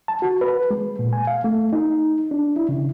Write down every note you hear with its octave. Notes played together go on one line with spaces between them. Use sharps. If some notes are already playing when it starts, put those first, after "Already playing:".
A5
F#4
B4
G#3
A#2
G#5
F5
A3
D#4
D4
E4
C#3